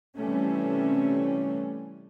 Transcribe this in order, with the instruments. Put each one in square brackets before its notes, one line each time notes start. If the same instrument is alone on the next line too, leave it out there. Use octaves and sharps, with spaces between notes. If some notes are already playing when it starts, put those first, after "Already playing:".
[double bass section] C3 E3 G3 A3 C4 C#4